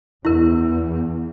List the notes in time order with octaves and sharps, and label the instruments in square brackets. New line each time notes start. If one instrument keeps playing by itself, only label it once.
[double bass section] E2 [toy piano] E4 A#4